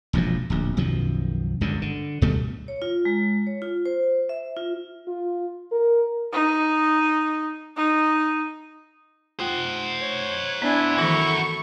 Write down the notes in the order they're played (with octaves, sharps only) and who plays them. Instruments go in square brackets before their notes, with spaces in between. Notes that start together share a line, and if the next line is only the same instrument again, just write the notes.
[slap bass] E1 A#1 F#2 F3
D1 A#1
B1 F#2 D#3 F3
G1 C#2 F#2 D3
D3
D2 B2 G3 A3
[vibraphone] C#5
F4
G#3
C#5
F4
C5
E5
F4
[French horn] F4
A#4
[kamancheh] D#4
D#4
[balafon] F4 G5 [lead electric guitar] C5 F#5
[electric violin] C#5
[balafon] B3 D5 [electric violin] D4 G#5 [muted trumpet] E4
[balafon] D#3 E3 B5 [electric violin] A3 C#6 [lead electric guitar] F#4 A#4